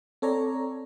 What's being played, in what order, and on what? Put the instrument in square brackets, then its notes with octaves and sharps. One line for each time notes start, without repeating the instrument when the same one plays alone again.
[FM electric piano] C4 A4 C#5 D5 A#5